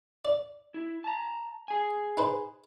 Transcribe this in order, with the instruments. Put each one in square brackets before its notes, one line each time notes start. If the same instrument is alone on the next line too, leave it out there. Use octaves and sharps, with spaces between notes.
[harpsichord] D5
[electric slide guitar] E4
A5 A#5
G#4 G#5
[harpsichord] D#4 B4 C5